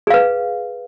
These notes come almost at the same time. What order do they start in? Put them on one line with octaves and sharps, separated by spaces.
G#4 F5 B4